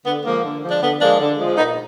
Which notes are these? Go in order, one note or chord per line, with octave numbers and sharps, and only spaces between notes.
D3 B3
F3 G#3 A#3
D3
F3 G#3
D4
D3 B3
F3 G#3 A#3 D4
D3
F3 G#3
A#2 B3 D#4